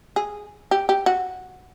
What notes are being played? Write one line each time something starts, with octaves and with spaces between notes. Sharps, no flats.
G#4
G4
G4
F#4